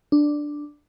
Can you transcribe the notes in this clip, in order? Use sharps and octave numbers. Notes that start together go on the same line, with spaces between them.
D4